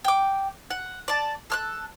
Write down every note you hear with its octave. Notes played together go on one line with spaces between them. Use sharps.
G5 D6
F#5
D5 A5
A4 F6 F#6